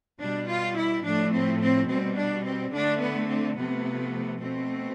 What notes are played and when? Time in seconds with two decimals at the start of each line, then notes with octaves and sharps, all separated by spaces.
0.20 B2 G3 D4
0.48 F4
0.76 E4
1.04 A2 F3 A3 D4
1.33 C4
1.60 C4
1.88 B2 G3 C4
2.16 D4
2.44 C4
2.72 D3 A3 D4
3.00 B3
3.28 C4
3.56 C3 F3 A3 B3
4.40 B2 A3 C4